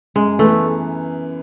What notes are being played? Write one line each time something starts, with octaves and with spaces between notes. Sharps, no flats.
F#2 G#3
E3 A3 B3